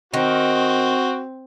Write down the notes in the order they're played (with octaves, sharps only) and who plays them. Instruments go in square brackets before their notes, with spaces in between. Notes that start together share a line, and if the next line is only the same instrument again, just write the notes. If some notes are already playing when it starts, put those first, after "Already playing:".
[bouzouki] D#3 [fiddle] C4 [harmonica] F#4